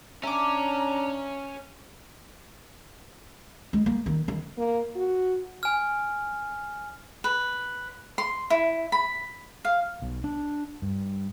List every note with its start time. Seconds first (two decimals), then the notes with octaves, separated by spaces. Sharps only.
0.23 C#4 D4 E5 A#5 D6
3.73 G#3
3.86 A#3
4.06 D#3
4.28 D#3
4.58 A#3
4.96 F#4
5.63 G#5 F6
7.24 B4
8.18 C6
8.50 E4
8.92 B5
9.65 F5
10.02 B1
10.24 D4
10.82 G2